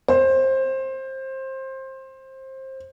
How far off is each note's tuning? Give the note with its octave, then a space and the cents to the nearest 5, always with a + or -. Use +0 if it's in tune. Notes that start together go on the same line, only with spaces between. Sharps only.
C5 +20